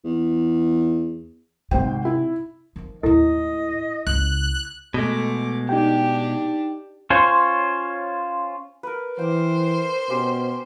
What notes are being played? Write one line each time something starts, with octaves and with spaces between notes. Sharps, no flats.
E2
G#1 C3 C5 G5
E4
D#3 F3
D#2 A2 E4 A4 D#5
C#2 C#3 F#6
B2 G#3 A3 D6
D4 D#4 G4 G5
C#4 F4 C5 C#5
A#4 B4
E3 C5 G5 D6
B2 C#4 G4 C6